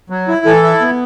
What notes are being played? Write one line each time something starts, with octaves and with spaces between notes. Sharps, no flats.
F#3
E4
E3 A4
E4
B3